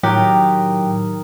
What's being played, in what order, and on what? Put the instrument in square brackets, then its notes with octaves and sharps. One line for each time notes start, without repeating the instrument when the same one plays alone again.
[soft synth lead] A2 [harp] D#3 A#4 [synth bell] F#3 [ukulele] F#4 G4 G5